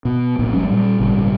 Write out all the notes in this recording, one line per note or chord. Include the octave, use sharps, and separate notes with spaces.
B2
C2 A#2
G#1 F#3 G#3 C#4
A#2 G3
G#1 A#2 C#3 G3